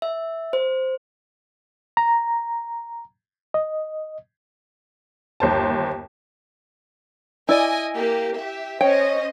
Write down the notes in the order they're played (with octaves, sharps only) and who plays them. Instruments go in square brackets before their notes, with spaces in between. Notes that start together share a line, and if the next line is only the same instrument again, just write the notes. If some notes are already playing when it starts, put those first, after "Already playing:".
[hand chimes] E5
C5
[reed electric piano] A#5
D#5
[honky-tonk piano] G1 D#2 C5 A5
[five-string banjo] E4 D5 [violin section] D#5 G#5
[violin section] A#3 G4
G4 E5
[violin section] C#4 C5 D#5 [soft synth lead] C#5 [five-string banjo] G5